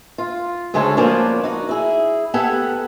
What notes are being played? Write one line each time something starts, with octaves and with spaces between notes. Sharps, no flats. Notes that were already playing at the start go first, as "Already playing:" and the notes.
F4
D2 C#3 G#3 A4 C5 C#5
F3 A#3 B3 C#4 D4
D#4 F#4
E4 G#4
B3 G4 A4 F#5 G#5